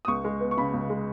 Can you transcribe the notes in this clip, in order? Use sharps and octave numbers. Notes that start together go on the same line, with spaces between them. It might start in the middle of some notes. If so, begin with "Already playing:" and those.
D#6
C#2 C#6
G#3
B3
C#6
C#3 B5
C#2
G#3